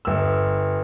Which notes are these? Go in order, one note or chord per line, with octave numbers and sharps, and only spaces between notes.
G1 E6